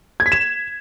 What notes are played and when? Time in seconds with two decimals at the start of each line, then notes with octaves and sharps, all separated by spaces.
0.20 G#6
0.26 B6
0.32 E7